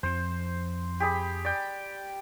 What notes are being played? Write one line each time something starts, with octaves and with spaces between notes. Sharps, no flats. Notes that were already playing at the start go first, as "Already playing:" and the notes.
F2 F3 C5
G4 G#4 B5
D5 G5